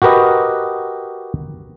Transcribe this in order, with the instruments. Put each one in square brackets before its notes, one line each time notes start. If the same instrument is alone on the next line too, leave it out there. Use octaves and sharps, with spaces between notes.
[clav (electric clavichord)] F#4 G4 A#4 B4 D#5